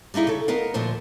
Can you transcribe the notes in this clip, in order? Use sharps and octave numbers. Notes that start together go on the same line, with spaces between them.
G3 A#3 D#4 E4 G#4
C#3 A4
B3 D#4 A#4 F5
D2 A#2 F3 C5